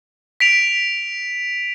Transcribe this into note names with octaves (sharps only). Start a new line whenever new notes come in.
B6 D7 F7